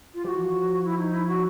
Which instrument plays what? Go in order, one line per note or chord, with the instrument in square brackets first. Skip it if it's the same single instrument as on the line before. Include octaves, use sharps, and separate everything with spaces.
[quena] F4
[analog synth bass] F3 [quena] G4
[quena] F#4
[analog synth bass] E3
F3
[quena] E4
D#4
E4
F#4